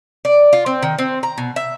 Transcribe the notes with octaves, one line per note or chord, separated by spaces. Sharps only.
D5
F4
C4
D#3
C4
A#5
B2
E5